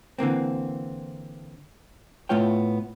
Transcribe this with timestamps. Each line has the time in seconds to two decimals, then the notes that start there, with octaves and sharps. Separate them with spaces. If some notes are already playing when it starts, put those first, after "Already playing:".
0.19 D3 E3 A#3 C4
2.29 A2 A3 B3 F4 C#5 G5